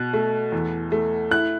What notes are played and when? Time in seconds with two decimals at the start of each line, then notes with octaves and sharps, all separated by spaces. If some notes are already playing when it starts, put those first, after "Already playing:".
Already playing: B2 F#6
0.14 A3
0.52 E2
0.92 A3
1.31 E4 F#6